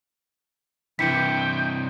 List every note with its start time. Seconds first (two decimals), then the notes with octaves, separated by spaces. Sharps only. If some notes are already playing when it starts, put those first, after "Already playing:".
0.99 G2 C3 E3 E4 G5 B6 C#7